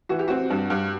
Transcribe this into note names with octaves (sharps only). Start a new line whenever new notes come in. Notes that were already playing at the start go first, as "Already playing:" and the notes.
E3 F#4
G4
C4 F#4
G2
G2